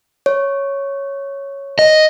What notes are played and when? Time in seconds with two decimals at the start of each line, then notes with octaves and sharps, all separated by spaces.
0.26 C#5
1.79 D#5